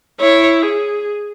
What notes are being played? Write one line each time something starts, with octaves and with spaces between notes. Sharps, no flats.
E4 C#5
G#4